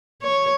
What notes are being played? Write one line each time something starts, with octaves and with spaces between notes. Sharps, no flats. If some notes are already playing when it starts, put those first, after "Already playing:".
C#5